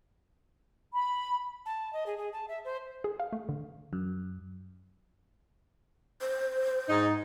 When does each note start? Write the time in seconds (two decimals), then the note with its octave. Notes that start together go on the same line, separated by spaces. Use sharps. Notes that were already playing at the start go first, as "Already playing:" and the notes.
0.93 B5
1.66 A5
1.93 D#5
2.06 G#4
2.18 G#4
2.33 A5
2.48 E5
2.65 C5
3.04 G#4
3.20 F5
3.32 A3
3.49 D3
3.93 F#2
6.21 C5
6.89 G#2 D#4